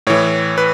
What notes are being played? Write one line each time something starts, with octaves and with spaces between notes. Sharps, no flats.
A2 E3 C#5
B4